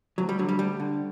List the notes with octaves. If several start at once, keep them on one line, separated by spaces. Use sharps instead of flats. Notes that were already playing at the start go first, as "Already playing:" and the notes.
D2 F#3
G3
D3 F#3
G3
D2 G3
D3